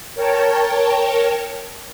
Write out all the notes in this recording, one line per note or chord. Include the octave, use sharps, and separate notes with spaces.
A#4 C#5 G5 A5